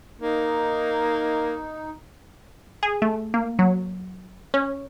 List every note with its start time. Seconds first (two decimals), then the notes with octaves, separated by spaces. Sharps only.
0.21 A#3 D#4
2.83 G#4
3.02 A3
3.34 A#3
3.59 F#3
4.54 C#4